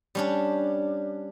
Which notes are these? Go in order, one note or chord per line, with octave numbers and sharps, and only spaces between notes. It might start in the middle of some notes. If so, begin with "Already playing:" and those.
G3 C#4 D4